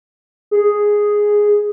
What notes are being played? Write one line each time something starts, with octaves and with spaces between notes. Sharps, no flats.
G#4